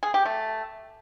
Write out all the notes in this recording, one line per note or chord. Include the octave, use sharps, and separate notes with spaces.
G#4
G4
A3